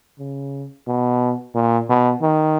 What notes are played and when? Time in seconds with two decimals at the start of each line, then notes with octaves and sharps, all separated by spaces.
0.19 C#3
0.87 B2
1.55 A#2
1.89 B2
2.22 D#3